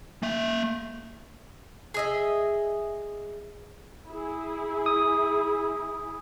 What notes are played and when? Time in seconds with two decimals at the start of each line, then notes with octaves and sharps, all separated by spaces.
0.23 A#3 E5
1.94 G#4 D#5 E5
4.08 E4 G#4
4.86 D#6